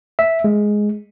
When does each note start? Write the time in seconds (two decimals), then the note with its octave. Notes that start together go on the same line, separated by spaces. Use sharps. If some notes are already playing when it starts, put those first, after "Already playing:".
0.19 E5
0.44 G#3